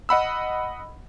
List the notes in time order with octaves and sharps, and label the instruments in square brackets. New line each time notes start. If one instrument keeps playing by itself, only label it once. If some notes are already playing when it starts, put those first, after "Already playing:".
[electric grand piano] D#5 F#5 B5 E6